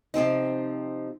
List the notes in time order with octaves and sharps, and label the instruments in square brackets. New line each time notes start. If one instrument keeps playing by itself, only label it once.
[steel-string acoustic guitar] C3 F3 C4 D#4